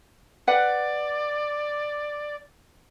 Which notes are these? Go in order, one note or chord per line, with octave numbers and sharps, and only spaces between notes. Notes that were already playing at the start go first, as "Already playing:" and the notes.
B4 D5 F#5